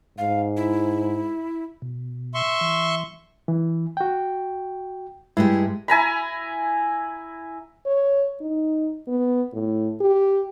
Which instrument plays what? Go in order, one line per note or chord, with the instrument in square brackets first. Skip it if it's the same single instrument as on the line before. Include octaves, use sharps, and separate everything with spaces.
[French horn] G#2 [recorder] F5
[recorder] E4
[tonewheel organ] B2
[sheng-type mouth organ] E5 C6 C#6
[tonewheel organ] E3
[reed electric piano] E3
F#4 G5
[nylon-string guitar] G2 G#3 G4 [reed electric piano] E4
[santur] E4 G#5 A#5 B5
[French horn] C#5
D#4
B3
A2
G4